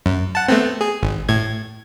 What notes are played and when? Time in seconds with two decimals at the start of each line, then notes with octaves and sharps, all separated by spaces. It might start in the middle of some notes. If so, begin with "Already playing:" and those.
0.06 F#2
0.35 F#5 A5
0.48 A3 B3 C4
0.81 G#4
1.03 G#1
1.29 A2 G#6